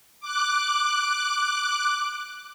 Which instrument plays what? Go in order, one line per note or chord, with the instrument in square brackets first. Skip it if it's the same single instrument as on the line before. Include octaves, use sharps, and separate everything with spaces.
[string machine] D6 F#6